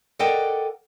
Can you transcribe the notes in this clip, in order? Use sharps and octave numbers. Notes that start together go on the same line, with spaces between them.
A4 A#4 D5 D#5 F#5 G5